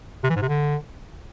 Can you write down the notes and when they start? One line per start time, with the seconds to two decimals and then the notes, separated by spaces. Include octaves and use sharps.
0.24 C3
0.30 E3
0.36 G#2
0.42 C3
0.48 D3